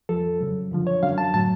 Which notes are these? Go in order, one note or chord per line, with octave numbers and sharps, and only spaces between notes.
F2 F3 A4
F#2 C#3 F#3
F#2 D3 F3
C#5
F#2 D3 F#3 F5
A5
A2 F#3 A5